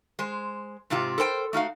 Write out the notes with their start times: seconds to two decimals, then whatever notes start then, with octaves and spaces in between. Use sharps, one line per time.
0.19 G#3 C5
0.90 G#2 C3 C4 F4 G4
1.18 A4 A#4 C5 G5
1.53 A3 D#4 F#4 F5